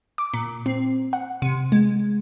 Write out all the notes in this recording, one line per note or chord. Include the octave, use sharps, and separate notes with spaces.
D6
A#2
C4
F#5
C3
G#3